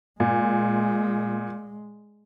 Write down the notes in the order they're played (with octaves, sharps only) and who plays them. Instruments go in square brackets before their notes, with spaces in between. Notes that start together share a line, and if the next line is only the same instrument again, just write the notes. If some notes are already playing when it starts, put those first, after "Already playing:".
[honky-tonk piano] A#2 [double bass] G#3